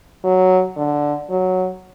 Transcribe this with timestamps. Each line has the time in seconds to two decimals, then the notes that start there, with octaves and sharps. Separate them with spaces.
0.24 F#3
0.77 D3
1.30 F#3